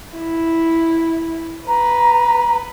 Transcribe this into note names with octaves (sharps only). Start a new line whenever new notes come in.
E4
B4 A#5